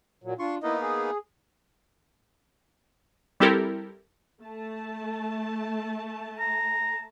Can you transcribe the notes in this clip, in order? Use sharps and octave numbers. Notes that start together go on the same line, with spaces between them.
A#2 F#3
D4 F4 C6 C#6
A#3 B3 D#4 E4 D#5
G#4
G3 C4 E4 G4 A4 A#4
A3 A5
A#5